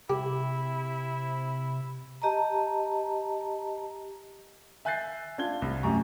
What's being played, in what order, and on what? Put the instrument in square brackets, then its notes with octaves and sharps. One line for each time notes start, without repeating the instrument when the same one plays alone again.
[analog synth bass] C3 [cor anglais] E4 [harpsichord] G4
[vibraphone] G4 D#5 A5 A#5
[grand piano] E5 G#5 F#6 G6 A6 C7
D4 F4 G#6 G7
C2
F#2 A2 G4 A#5 C#6